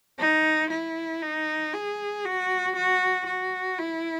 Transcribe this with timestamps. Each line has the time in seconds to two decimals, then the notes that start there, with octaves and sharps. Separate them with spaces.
0.19 D#4
0.70 E4
1.22 D#4
1.73 G#4
2.25 F#4
2.76 F#4
3.26 F#4
3.78 E4